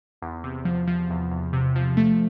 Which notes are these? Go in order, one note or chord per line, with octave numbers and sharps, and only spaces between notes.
E2
C3
F3
F3
E2
E2
C3
F3
A3